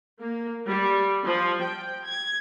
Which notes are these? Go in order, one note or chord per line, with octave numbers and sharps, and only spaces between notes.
A#3
G3
F3
G5
G#6